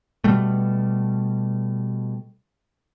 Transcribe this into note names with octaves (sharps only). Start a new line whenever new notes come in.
B2 G3 A3